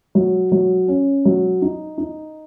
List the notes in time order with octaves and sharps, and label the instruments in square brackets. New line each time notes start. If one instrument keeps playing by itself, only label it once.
[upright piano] F#3
F#3
C#4
F#3
D#4
D#4